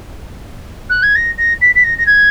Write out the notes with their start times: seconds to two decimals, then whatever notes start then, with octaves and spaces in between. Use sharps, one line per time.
0.90 F#6
1.03 G#6
1.16 A#6
1.38 A#6
1.61 B6
1.75 B6
1.84 A#6
1.98 A#6
2.07 G#6